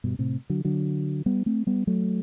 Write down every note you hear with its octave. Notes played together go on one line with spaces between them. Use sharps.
G2 B2
A2 C3
D3 F#3
D3 F#3
G3 B3
A3 C4
G3 B3
F#3 A3